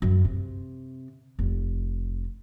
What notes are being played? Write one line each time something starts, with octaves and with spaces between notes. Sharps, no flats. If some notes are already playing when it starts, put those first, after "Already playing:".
F#2
C3
F1